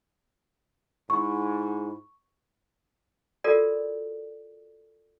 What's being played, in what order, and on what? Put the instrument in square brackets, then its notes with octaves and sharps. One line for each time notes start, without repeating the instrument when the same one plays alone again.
[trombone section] G#2 [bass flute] E4 [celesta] C#6
[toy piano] F4 F#4 A4 A#4 D5